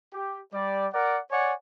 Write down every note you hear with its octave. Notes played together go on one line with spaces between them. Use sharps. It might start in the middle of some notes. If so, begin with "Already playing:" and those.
G4
G3 D5
A#4 D5 F#5
C#5 D5 F#5 G#5